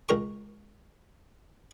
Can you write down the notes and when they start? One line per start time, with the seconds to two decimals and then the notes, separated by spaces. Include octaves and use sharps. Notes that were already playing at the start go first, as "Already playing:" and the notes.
0.09 C#2 A#4 C#6